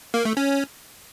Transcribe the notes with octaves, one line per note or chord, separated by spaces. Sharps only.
A#3
A3
C#4